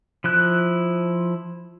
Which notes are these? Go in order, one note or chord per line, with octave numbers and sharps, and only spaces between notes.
F3 E4 F#6